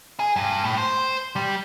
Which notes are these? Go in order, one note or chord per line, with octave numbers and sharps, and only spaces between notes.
G#4
G2
A2
C5
G3